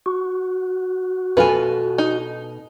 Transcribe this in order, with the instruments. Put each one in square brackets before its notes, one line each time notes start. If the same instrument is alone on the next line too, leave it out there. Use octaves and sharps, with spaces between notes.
[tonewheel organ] F#4
[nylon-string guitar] B2 A4 G#5 [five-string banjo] F4 B4
[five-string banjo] D#4